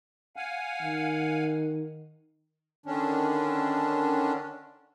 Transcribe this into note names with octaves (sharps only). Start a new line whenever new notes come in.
F5 F#5 G#5
D#3
D3 D#3 C#4 D4